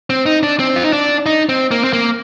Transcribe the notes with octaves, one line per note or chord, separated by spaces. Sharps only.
C4
D#4
D4
C4
F4
D#4
D4
D#4
C4
A#3
C4
A#3